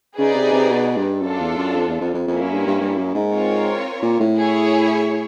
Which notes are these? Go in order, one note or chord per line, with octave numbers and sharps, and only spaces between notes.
C#3 D#4 G#4 B4 D5
C3
C3
B2
G2
F#2 D4 F4 A4
E2
F#2
F2
E2
F2
F2
F2 A#3 C#4 E4
F#2
G2
G2
G2
F#2
G#2
C4 F4 A#4 C#5
A#2
A2
E4 G#4 C#5